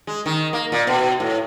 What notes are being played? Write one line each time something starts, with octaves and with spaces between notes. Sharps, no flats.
G#3
D#3
A#3
A#2
B2
A2